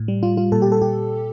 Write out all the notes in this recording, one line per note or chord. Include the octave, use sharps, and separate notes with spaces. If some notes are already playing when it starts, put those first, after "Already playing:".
Already playing: A2
G3
G3 F4
G3 F4
A#2 A4
G4
A#2 A4
A#2 G4